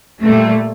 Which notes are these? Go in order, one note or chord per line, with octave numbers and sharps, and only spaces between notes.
A#2 G3 A3